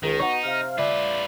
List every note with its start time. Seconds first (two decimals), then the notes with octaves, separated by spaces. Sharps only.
0.03 C#2 D#3
0.20 B3 D#4 F#4 C#6
0.44 C3 F5 F6
0.78 F4 B4 D5 E5